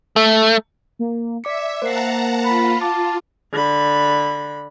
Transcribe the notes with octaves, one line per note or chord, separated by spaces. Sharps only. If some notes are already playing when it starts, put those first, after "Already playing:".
A3
A#3
D5 E5 D6 B6 C#7
A#3 C5 F#5 A5 A#5 C7
F4 B5
A5 D6
D3 B5